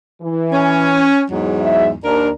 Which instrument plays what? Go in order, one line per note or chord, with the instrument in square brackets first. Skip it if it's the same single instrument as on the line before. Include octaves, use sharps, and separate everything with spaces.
[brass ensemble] E3
[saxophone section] C#4
E2 G#2 F#3
[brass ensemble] E5
[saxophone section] D#2 A#4 [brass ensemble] D4